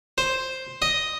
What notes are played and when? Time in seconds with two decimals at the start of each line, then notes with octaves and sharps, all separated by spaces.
0.18 C5
0.82 D#5